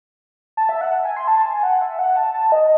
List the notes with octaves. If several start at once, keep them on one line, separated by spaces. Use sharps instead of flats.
A5
E5
F#5
G#5
C6
A5
G#5
F#5
E5
F#5
A5
A5
D#5